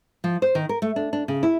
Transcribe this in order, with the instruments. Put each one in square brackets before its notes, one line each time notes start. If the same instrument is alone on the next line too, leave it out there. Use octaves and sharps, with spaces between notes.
[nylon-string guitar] F3
C5
D#3
A#4
A3
D4
D4
C#3
E4